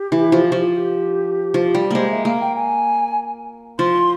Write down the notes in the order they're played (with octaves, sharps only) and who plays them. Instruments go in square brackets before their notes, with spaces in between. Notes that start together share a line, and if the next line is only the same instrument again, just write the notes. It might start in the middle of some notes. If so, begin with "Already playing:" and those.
Already playing: [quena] G4
[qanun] E3
F3
F3
[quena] G4
[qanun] F3
G3
[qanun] G#3 A#3 [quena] C5
[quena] E5
[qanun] A#3 [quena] F5
[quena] G5
G#5
[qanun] F3 [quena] C6